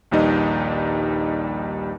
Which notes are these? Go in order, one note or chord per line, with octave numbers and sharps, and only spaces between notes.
A#1 D#2 G3 D#4 B4 D#5